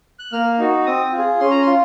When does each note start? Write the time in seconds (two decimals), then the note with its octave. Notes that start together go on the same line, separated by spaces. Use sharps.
0.19 F#6
0.32 A#3 F6
0.59 D#4 F#4
0.86 C4 D#6
1.12 F4
1.18 G#4
1.40 C#4 C6
1.51 A#5
1.62 C6
1.67 F4